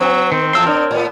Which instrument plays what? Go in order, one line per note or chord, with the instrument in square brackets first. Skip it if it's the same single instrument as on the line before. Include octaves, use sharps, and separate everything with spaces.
[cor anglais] F#3 [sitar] B3
[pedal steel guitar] D#3 [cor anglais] C4
[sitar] E2 F3 E5 [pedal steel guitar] C6 E6
[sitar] D4 [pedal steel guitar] A#4 C#5
[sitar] A2 B3